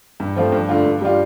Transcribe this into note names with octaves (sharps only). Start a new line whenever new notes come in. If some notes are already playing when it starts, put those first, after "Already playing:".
G2
F3 A3 C4 F4
G2
D3 A3 D4 F4
G2
G3 D4 F4